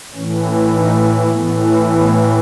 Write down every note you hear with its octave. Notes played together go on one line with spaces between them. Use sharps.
A2 E3 C#4
C#4
D#4
A2 E3 B3
B3